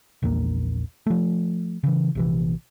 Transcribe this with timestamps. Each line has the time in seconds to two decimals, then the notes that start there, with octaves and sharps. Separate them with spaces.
0.23 A#1 E2 A#3
1.06 F3 A3
1.83 C#3 E3
2.15 A#1 C3 E3